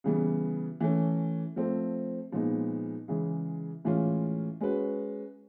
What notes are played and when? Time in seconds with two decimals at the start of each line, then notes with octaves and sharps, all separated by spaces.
0.04 C#3 E3 G3 B3
0.81 E3 A3 C#4
1.56 F3 A3 C4
2.32 A#2 F3 G#3 B3 D#4
3.08 C#3 E3 G#3
3.85 A2 E3 G#3 C#4 F4
4.61 G#3 C#4 F#4 B4